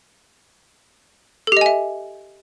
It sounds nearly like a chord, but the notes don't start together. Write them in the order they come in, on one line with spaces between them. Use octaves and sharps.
A4 G4 D#5 G#5 E5